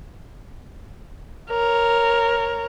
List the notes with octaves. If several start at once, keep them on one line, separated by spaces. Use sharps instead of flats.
A#4 C#5